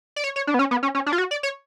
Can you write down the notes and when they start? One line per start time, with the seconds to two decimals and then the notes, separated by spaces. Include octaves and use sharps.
0.16 D5
0.24 C#5
0.36 C#5
0.47 D4
0.54 B3
0.59 C#4
0.71 B3
0.83 C#4
0.95 C#4
1.06 D4
1.13 F4
1.18 F#4
1.31 D5
1.43 C#5